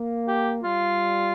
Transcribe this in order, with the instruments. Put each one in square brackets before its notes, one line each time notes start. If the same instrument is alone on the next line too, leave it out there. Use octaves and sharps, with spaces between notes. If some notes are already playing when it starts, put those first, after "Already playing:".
Already playing: [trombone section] A#3
[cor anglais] G4
[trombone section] G3 [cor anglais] F4